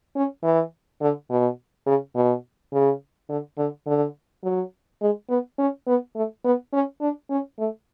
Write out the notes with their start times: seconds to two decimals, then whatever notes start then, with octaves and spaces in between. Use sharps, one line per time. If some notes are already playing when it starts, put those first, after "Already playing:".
0.16 C#4
0.43 E3
1.02 D3
1.30 B2
1.87 C#3
2.15 B2
2.73 C#3
3.29 D3
3.58 D3
3.87 D3
4.44 F#3
5.02 G#3
5.29 B3
5.58 C#4
5.87 B3
6.16 A3
6.45 B3
6.73 C#4
7.01 D4
7.30 C#4
7.59 A3